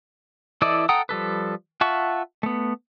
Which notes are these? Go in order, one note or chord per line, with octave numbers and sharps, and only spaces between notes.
E3 E4 A4 D5 D#5
A4 F#5 G5 A#5 D#6
F3 G3 A4 B4
F4 E5 F#5 A5 C#6
A3 B3